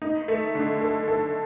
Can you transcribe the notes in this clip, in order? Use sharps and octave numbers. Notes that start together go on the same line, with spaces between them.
D#4
A3
D3
A4
A4